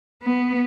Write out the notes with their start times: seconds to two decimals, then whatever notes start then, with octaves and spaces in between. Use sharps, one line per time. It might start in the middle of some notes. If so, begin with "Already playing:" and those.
0.23 B3